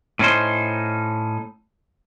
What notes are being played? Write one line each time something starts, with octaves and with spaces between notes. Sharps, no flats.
A2 C#4 D#4 C5